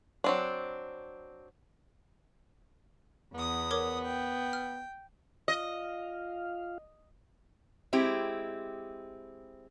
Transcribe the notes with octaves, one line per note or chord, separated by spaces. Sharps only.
F#3 C4 D4
E2 B3 D#6
A#4 C#5 D6
G5
F6
F4 D#5 F5
G#3 C4 E4 G4